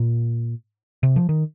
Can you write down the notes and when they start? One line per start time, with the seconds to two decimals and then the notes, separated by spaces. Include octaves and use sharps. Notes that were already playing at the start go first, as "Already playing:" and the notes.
Already playing: A#2
1.03 C3
1.16 F3
1.29 D#3